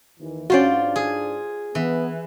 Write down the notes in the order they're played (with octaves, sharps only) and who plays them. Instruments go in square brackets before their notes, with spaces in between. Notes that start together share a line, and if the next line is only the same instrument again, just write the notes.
[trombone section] D#2 E3
[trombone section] G#2 D4 [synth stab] C#4 F#4 [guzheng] F4 C5 D5
[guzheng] G#4
[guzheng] E3 [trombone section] B3